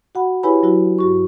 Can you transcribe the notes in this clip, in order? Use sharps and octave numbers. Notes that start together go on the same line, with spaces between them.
F#4 F#5 B5
E4 G4 B4 C#5 G#5 B5
F#3 E4 F#4
G2 F#4 C#6